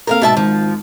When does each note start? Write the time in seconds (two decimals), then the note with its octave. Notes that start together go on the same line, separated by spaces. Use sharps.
0.07 A#3 C4 A4 A#4 E5 F5
0.22 G#2 B2 E5 A5
0.37 G#1 G#2 F3